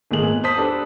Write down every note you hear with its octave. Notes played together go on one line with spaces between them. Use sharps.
G#1 A#2 A3 G#4 F#7
B3
C5 A5 D#6 B6
D4 G4 A4 B4